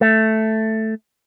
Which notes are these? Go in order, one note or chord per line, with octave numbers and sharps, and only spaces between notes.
A3